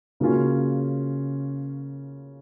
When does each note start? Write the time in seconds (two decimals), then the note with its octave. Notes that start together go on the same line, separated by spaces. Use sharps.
0.20 C#3 F#3 A#3 C#4 F4